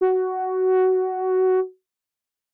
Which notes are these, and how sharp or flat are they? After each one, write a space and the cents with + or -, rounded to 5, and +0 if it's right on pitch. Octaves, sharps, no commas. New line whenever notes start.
F#4 +10